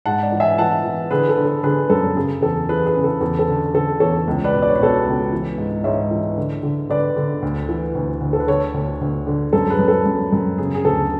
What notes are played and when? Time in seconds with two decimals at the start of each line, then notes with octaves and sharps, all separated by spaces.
0.06 G#2 F#5 A5
0.23 D5 F#5
0.32 E3
0.40 E5 G#5
0.58 E3 F#5 A5
0.84 E3
1.11 D3 G#4 B4
1.29 A4
1.37 D3
1.46 A4
1.63 D3 G#4 B4
1.90 F#2 A4
2.16 C#3 G#4
2.42 E2 A4
2.69 E3 G#4 B4
2.86 G#4 B4
2.96 C#3
3.04 A4
3.21 E2 A4
3.39 A4
3.48 D3
3.74 D3 A4
4.00 E2 A4 C#5
4.27 C#2
4.44 B4 D5
4.53 B2
4.62 D5
4.69 C#5
4.76 B4
4.79 B2 A4 C#5
5.06 C#2
5.32 E3
5.58 G#2
5.84 G#2 C#5 E5
6.11 E3
6.37 D3
6.63 D3
6.89 D3 B4 D5
7.16 D3
7.42 D2
7.68 E3
7.95 D2
8.21 D2
8.33 A4
8.40 B4
8.48 D3 A4 C#5
8.74 D2
9.01 D2
9.27 D3
9.53 F#2 A4
9.70 G#4 B4
9.79 F#2
9.88 A4
10.06 F#2
10.33 F#2
10.58 C#3 G#4
10.75 G#4
10.85 D2 A4